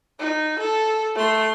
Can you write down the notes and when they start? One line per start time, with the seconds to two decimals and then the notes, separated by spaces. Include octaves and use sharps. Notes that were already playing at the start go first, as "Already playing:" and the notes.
0.20 D#4
0.60 A4
1.15 A3 C6